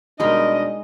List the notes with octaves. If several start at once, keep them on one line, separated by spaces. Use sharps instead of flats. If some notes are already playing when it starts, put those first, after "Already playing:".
B2 G3 G#3 D4 D#4 A#4 D#5